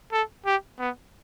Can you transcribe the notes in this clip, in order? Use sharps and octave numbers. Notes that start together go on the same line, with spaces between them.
A4
G4
B3